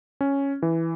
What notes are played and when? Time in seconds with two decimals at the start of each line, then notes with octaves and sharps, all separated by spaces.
0.21 C#4
0.62 E3